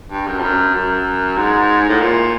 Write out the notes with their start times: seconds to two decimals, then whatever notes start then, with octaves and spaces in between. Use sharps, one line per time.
0.12 G2
0.27 F#2
0.38 F2
0.43 F#2
0.75 F#2
1.37 G#2
1.89 A2
2.01 A#2